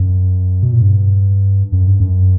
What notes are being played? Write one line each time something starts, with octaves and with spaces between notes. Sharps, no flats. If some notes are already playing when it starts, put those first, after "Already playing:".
Already playing: F#2
B2
A#2
G2
F#2
G2
F#2